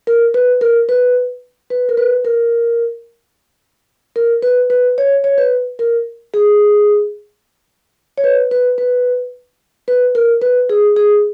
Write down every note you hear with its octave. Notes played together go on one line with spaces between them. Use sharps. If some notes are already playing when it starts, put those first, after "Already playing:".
A#4
B4
A#4
B4
B4
A#4
B4
A#4
A#4
B4
B4
C#5
C#5
B4
A#4
G#4
C#5
B4
B4
B4
B4
A#4
B4
G#4
G#4